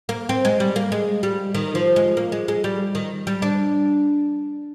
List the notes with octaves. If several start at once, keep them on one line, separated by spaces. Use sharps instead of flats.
A#3
C4
G#3
G3
A#3
G#3
G3
D#3
F3
G#3
A#3
G#3
G#3
G3
D#3
G3
D4